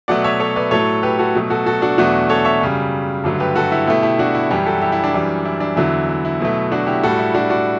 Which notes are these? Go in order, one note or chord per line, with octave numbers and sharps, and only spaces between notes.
B2 F#3 A3 D5 F#5
C#5 E5
A4 C#5
B4 D5
A2 F#3 A3 A4 C#5
G4 B4
F#4 A4
B2 F#3 A3
F#4 A4
F#4 A4
D4 F#4
E2 B2 F#3 A3 D4 F#4
A4 C#5
C#5 E5
F#2 C#3 G3
G2 D3 F#3 A3
G4 B4
F#4 A4
E4 G4
B2 A3 E4 G4
E4 G4
D4 F#4
E4
F#2 E3 G3 E4 G4
F#4 A4
E4 G4
E4
D4
F#2 E3 G3
E4
D4
E2 D3 F#3 E4
E4
E4
B2 F#3 A3
D4 F#4
E4 G4
A2 G3 F#4 A4
E4
D4 F#4
D4 F#4